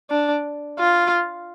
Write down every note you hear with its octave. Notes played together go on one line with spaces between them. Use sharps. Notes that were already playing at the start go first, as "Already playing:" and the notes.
D4
F4